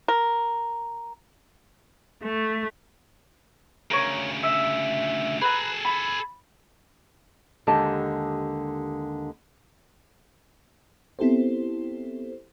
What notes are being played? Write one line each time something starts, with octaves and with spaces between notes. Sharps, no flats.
A#4
A3
D2 C#3 A#4 C#5
E5
G#4 A4 B4 A#5
B5
D#2 D3 G#3 G4 D#5 A5
B3 C4 E4 G4 A4 C5